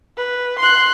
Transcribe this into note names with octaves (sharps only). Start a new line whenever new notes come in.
B4
C6 F#6